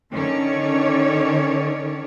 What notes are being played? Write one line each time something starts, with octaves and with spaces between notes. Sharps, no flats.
D3 D#3 C#4 A4 C#5 D5